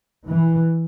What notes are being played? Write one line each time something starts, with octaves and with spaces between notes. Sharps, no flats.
E3